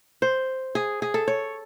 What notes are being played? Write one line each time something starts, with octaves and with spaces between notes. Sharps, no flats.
C5
G#4
G#4
A4
C#5